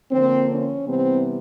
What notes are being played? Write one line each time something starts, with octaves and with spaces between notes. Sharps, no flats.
D3 F3 A#3 C4
C#4
C3 E3 G3 B3 C4